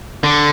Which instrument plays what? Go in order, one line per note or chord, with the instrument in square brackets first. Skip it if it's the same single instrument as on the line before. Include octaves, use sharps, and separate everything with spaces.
[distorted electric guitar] D3